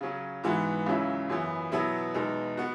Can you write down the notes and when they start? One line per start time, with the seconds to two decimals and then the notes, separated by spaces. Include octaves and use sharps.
0.01 C#3 F#3 C#4
0.44 G#2 E3 B3 F#4
0.86 C#2 C#3 F#3 C#4 E4
1.29 F#2 E3 B3
1.72 B2 F#3 B3 E4
2.14 E2 B2 G#3 D#4
2.57 B3 F#4